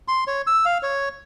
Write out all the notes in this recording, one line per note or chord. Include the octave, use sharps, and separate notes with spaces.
C6
C#5
E6
F5
C#5